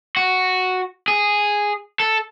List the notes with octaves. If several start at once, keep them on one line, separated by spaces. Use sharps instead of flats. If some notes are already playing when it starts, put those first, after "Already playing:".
F#4
G#4
A4